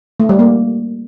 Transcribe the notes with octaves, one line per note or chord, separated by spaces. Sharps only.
A3
G3
A#3